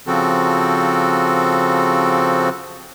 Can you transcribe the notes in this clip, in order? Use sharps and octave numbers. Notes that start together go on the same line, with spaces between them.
C#3 F3 C4 F#4 A4